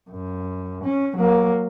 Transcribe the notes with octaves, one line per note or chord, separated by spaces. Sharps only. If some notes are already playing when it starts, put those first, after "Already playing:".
F#2
C#4
F#3 A#3